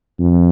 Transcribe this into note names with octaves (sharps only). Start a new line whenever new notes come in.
F2